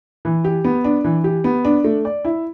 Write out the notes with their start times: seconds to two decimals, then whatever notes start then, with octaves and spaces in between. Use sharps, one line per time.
0.25 E3
0.44 G4
0.65 B3
0.84 D4
1.04 E3
1.24 G4
1.44 B3
1.65 D4
1.84 A3
2.05 D5
2.25 E4